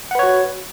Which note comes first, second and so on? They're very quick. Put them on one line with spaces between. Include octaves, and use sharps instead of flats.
F#5 B4 C#5 F#4